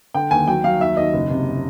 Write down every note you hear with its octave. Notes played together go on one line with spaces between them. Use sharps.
D3 G5
D#2 G#5
F#3 G5
F#3 F5
D#2 E5
D#2 D#5
F#1
C3